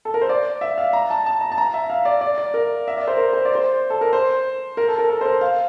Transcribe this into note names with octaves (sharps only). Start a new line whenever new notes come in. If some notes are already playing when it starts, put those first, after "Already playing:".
A4
A#4
C5
D5
E5
F5
A#5
A5
A5
A#5
A5
A#5
E5
F5
D5
D5
D5
A#4
E5
D5
C5
A#4
C5
D5
C5
A4
A#4
C5
A#4
A4
A#4
A4
C5
A#4
F5